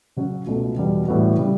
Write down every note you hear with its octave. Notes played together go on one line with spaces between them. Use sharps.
C#3 F#3 C#4 F#4
C#2 B2 A3
E2 B2 G3
A2 E3 G3 B3 F#4
C#3 G3